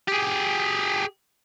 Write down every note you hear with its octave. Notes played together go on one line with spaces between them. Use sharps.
G4 G#4